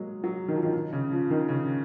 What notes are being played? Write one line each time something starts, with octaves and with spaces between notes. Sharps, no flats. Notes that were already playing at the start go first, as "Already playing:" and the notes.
Already playing: F#3 G#3 A#3
F#3
D#3
F3
D#3
D#3
C#3
F3
D#3
C#3